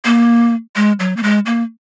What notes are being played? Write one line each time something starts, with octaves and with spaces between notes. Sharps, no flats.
A#3
G#3
F#3
A#3
G#3
A#3